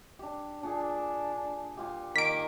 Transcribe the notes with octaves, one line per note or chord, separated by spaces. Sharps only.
D4 G4
A#2 D4 G#4
A#2 F4 G4
D#3 A#3 B6 D7